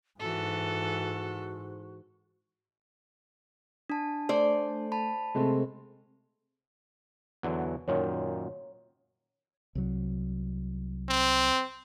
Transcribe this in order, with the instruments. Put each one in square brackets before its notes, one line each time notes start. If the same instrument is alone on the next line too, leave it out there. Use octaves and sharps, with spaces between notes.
[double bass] G#2 [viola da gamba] E3 A4 [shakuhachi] F#4
[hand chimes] D4 A5
[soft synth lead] A3 [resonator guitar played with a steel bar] C5 D5
[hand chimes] A5 B5
[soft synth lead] C3 [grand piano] G#3 A3 C4
[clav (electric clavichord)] E2 D3 F#3
[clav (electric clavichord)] F#2 A#2 D#3 [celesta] C#5
[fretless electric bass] C2 F#3
[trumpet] C4